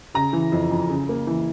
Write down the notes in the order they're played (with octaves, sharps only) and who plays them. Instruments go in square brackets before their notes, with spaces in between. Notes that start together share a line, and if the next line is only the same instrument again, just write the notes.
[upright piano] C#3 A#5
E3
F2
F2
C#3
A#3
E3